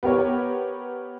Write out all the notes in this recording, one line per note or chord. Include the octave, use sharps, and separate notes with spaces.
B3 G4 A#4 C#5